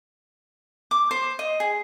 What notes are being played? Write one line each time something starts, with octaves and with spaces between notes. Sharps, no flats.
D6
C5
D#5
G#4